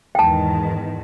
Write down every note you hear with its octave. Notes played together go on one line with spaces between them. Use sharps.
E2 G#2 D#3 G5 A5